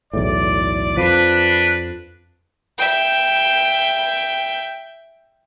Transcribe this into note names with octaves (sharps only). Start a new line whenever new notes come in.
B1 E2 A2 D5
F2 F3 D4 B4
E5 G5